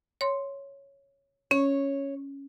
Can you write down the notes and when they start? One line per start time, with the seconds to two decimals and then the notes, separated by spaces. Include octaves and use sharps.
0.21 C#5 C6
1.51 C#4 C#5